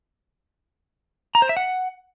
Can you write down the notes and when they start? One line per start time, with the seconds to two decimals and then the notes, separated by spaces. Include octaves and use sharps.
1.35 A#5
1.42 C5
1.49 E5
1.57 F#5